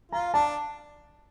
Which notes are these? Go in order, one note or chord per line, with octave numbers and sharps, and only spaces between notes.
F4 A#5
D4 A5